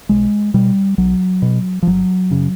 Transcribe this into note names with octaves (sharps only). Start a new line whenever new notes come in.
B1 G#3
B2 G3
B1 F#3
B2
F3
G1 F#3
F#2 C#3